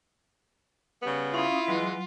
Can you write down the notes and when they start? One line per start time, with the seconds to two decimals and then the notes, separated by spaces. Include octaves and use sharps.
1.03 C#3 G3 B3
1.33 C#4 E4 F4 F5 D#6
1.68 E3 F#3 G#3